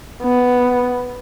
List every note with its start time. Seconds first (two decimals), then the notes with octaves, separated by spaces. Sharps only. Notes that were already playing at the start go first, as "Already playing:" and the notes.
0.23 B3